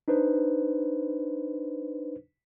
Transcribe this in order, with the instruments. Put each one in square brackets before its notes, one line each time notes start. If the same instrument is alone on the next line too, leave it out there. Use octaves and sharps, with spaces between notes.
[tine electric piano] D4 D#4 B4 C5